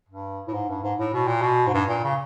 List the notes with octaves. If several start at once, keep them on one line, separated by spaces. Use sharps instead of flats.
G2
A2
G#2
G2
G#2
A2
B2
A#2
B2
G#2
G2
A#2
C#3